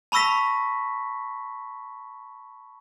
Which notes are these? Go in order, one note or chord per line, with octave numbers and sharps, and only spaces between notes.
A5 B5 C#6 E6 A#6 B6